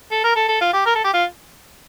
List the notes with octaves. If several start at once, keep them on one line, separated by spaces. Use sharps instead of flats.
A4
A#4
A4
A4
F4
G4
A#4
A4
G4
F4